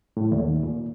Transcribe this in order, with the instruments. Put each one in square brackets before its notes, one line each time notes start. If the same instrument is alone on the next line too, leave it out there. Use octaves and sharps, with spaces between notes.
[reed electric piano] A2
D#2
A#2